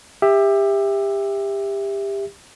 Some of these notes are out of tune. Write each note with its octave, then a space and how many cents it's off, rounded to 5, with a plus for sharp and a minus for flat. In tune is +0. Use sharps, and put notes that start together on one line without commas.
G4 +25 E5 +0